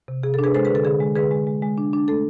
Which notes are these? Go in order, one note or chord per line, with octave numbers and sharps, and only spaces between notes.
C3
C3 G#4
A4
D4
G#4 B4
G#3 A4 C5
G#4 B4
D3 A4
D3 G#4
G#3
D3 G#4 B4
G#3
G#3
G#3
D4
D4
A3 A4